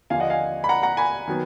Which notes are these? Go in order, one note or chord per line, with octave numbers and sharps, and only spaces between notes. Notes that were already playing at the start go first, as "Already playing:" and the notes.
D#2 D3 F3 A#3 F5 G#5
D#5 F#5
F5 G#5
B5
F#5 A#5
F#5 A#5
G#5 B5
D#3 F#3 B3